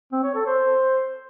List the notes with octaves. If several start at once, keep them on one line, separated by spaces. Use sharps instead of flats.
C4
C#5
A4
C5